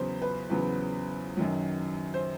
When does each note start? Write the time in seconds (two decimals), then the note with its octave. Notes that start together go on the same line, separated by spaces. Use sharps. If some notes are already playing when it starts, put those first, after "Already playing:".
Already playing: E2 C#3 F#3 B3 C5
0.22 B4
0.50 E2 C#3 F#3 B3
1.37 F#2 D#3 F#3
2.14 C5